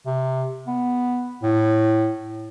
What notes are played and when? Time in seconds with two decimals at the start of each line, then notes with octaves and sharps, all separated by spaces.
0.06 C3
0.67 B3
1.42 A2